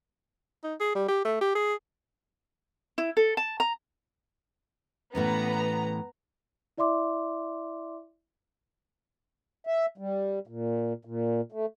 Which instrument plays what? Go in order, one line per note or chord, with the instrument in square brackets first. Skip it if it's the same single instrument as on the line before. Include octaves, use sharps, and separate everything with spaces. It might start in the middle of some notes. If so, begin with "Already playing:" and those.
[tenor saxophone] D#4
G#4
G3
G4
A3
G4
G#4
[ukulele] E4
A4
A5
A#5
[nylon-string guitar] A2 E3 C#4 [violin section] B3 A#5
[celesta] E4 D5 E5 C6 D6
[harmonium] E5
G3
A#2
A#2
A3